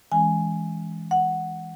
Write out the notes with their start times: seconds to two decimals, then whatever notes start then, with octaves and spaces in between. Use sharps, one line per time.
0.12 E3 G#3 C#4 G#5
1.11 F#5